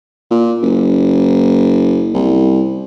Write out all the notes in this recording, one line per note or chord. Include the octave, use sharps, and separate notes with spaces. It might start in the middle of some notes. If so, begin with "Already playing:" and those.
A#2
F#1
C2